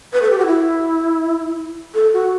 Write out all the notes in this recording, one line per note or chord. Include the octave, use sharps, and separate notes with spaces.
B4
A4
G4
F#4
E4
A4
F#4